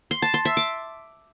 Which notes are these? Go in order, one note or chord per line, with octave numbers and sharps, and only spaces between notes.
C6
A5
C6
E5
D6